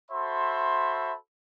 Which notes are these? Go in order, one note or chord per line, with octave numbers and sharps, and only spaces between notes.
F#4 A4 C5 E5 B5 C6